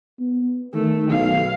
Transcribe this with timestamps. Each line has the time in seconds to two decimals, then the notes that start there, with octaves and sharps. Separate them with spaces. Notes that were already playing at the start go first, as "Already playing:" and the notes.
0.19 B3
0.74 D#3 A3
1.11 B1 F5